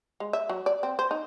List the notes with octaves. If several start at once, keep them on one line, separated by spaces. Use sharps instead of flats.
G#3
E5
F#3
D5
C4
C5
D#4